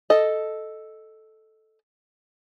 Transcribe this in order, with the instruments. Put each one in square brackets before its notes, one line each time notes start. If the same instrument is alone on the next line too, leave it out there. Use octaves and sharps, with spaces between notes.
[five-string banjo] A4 D#5